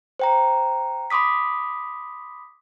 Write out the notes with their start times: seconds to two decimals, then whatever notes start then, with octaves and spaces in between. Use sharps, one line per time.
0.19 C5 G5 A#5
1.10 B5 C6 D6 D#6 B6